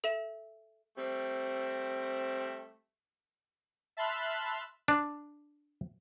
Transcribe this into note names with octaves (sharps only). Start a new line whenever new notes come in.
A4 E5 E7
G3 A3 C4
E5 A5 B5 C6 F6 F#6
D4